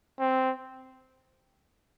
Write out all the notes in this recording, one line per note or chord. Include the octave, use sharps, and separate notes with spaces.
C4